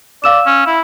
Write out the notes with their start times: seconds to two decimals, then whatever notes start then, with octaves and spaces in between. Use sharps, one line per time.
0.24 D5 F5 E6 E7
0.46 C#4
0.66 E4